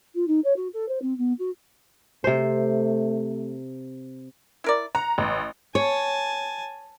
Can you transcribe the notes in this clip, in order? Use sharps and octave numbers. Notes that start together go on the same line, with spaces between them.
F4
D#4
C#5
F#4
A4
C5
C4
B3
F#4
C3 A3 C5
E4 A#4 D5
F#5 A#5
A1
C#5 G#5 A5